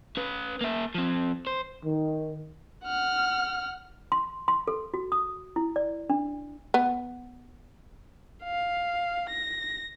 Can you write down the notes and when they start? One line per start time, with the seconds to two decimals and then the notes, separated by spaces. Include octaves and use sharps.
0.17 C#4 B4
0.61 A#3 E5
0.95 F3 C4
1.47 C5
1.85 D#3
2.84 F#5 F6
4.12 C6
4.48 C6
4.68 A4
4.94 F#4
5.12 D#6
5.56 E4
5.76 D5
6.10 D4
6.74 B3
8.44 F5
9.29 A#6